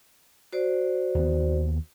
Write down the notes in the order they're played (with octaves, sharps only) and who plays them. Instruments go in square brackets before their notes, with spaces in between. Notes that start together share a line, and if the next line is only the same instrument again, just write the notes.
[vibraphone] F#4 C5 D5
[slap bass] D#2 B3